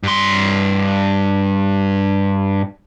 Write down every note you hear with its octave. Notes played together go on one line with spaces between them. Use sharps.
G2 C6